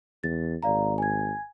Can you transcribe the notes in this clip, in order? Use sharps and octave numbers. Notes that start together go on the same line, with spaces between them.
E2 A6
G#1 D5 F5 A#5
G#5 G#6